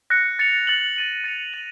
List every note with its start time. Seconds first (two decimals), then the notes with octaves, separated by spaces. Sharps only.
0.10 F#6 A#6 C#7
0.39 A6 C#7 F7
0.67 F#6 A6 C#7 F#7
0.96 A6 D#7 F#7
1.24 A6 C#7 F7
1.53 A6 D#7 F#7